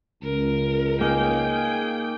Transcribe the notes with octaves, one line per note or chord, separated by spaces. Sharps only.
C#2 A#4
A#3 D#4 G#4 F5 G5